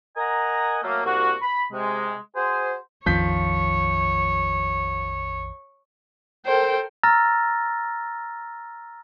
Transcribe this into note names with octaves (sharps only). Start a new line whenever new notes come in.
A#4 D#5 F#5 G#5 A#5
F#3 A3 A#3
C2 A#3 F#4
B5
C3 G#3
F#4 G#4 C5
A#1 F2 D#3 F3 C#5 G6 B6
A4 A#4 C5 G5
A#5 E6 F6 A6 A#6